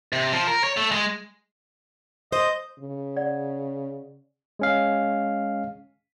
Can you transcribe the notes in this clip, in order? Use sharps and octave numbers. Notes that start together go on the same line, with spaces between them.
C3
F3
A#4
C#5
A3
G#3
C5 D#5
C#3
D5 F#5
G#3 C#4 F5